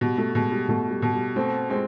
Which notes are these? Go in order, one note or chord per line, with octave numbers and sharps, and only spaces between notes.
B2 G3
A3
B2 G#3
G3
B2 A3
G3
B2
G3
A3 C4
G#3 C4